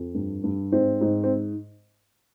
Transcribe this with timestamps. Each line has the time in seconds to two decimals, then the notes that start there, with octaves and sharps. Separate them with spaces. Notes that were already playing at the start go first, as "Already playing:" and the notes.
Already playing: F2
0.15 G2
0.44 G2
0.72 G#2 C4
1.01 G#2
1.24 C4